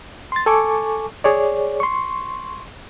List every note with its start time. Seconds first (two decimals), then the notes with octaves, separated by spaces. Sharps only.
0.32 C6 A6
0.46 A4 G#5 A5 C#6 D6
1.24 G#4 C#5 D5
1.80 C6 C#6